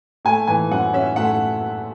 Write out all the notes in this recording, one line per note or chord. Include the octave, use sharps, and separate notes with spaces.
A3 G#5
E3 G#5
F#2 F#5
C#4 E5
A3 F#5